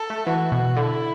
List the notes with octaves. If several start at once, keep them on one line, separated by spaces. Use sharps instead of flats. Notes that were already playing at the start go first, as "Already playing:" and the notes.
Already playing: A4
A3
E3 F#4
B2
D3 E4